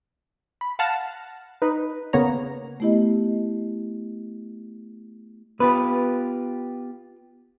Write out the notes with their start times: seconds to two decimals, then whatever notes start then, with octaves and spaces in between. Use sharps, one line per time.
0.61 B5
0.79 F5 F#5 A5 F6 A#6
1.62 D#4 B4
2.13 C#3 A#3 B3 C#5 A#5
2.80 A3 B3 E4 G4 D#5
5.60 B3 F4 G4 B4